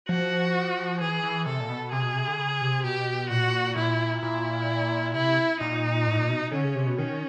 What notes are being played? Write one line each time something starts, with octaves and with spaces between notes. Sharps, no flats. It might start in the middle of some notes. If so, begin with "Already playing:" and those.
F3 F#4
E3 G#4
E3
C3 A4
A#2
B2
C3 G#4
B2
C3
D3
C#3
C3
B2 G4
A#2 F#4
A#2 E4
A#2 E4
C3 E4
A#2 D#4
A2
A#2
B2
D3 C#4
C#3
C3
B2
D#3 C#4